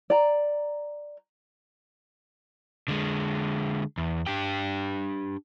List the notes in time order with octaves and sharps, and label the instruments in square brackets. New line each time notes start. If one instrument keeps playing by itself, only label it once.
[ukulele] D5 A#5
[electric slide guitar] D3 G#3
E2
D4 G4 G5